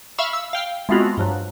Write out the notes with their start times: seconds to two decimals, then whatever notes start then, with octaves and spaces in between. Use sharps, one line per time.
0.18 E5 F5 B5 C#6 E6 F6
0.33 E6
0.53 F5 G5 F6
0.89 G#3 A3 B3 C4 F4 F#4
1.17 G2 F3 F#3